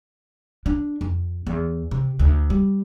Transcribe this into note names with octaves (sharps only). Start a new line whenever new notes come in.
D4
F2
E2
C3
D2
G3